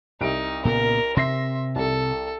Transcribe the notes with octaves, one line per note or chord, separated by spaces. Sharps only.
C2 D#4 D7
A#2 C#3 B3 A#4
C3 E5 C6 A#6 C7
C2 A4